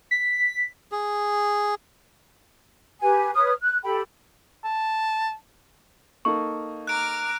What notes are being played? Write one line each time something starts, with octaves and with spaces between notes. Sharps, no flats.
B6
G#4
G4 B4 G#5
B4 C#5 D#6 F6
F#6
G4 A4 G5 B5
A5
A#3 D#4 A4 C#6
A#5 D6 F6 F#6 D7